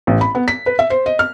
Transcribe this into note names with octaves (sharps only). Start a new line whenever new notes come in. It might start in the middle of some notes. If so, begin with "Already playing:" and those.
A1
B5
B3
B6
B4
E5
C5
D#5
F6